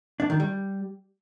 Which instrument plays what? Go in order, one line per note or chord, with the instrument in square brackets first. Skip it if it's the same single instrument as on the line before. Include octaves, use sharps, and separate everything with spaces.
[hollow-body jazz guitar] D4
D#3
G3